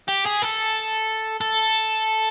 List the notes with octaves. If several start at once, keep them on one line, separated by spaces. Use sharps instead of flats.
G4
G#4
A4
A4